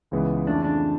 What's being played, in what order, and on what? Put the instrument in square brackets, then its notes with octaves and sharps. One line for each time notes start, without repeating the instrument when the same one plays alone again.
[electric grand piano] C#2 C#3 E3 G#3 B3
[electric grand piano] F2 C#3 E3 A3 [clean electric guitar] D4
[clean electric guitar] D4